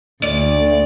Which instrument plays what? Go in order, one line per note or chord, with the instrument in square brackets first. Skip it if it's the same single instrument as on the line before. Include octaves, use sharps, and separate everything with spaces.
[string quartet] D2 [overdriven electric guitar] D5